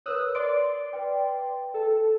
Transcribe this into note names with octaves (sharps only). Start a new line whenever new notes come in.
A#4 B4 C#5 D#6 E6 F#6
D5 C6 D7
B4 G5
A4